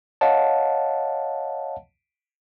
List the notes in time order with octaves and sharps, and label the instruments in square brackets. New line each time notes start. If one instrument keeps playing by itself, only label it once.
[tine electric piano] C#5 D#5 F5 F#5 A5